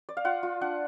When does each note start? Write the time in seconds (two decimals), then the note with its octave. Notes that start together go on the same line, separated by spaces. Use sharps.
0.09 D5
0.17 F5
0.25 F4 F#5
0.43 F4
0.61 D4 F#5